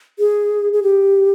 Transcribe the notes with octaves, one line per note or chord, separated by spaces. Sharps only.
G#4
G#4
G4